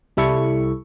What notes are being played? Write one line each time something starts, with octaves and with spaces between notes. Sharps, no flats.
C2 G3 E4 A4 E5 C#6